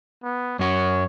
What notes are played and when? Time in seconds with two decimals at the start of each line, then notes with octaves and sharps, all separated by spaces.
0.23 B3
0.59 F#2 F#4 C#5